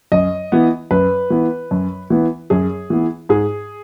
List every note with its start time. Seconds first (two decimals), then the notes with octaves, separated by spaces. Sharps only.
0.12 F#2 D#5
0.52 E3 B3
0.91 F#2 B4
1.30 E3 B3
1.71 F#2
2.10 E3 B3
2.50 F#2 G#4
2.90 E3 B3
3.29 G#2 G#4